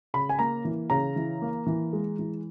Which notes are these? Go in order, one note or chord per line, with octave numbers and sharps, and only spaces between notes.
C#3 B5
G#5
A#3 A#5
E3
C#3 A#5
E3
A#3
E3
G#3
E3